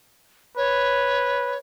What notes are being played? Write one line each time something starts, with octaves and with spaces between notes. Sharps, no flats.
B4 C#5